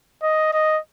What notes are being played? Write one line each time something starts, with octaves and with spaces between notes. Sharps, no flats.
D#5
D#5